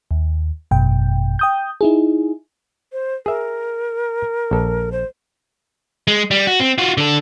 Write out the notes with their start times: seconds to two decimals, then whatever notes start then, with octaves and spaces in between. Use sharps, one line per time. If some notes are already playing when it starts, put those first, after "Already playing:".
0.11 D#2
0.71 G#1 F#2 B2 G5
1.39 G5 D#6 G6
1.81 D#4 E4 G#4
2.92 C5
3.26 G#4 A#4 E5
4.51 A#1 A4
4.92 C5
6.08 G#3
6.31 G3
6.47 F#4
6.60 C4
6.78 F4 F#4
6.98 D3 A4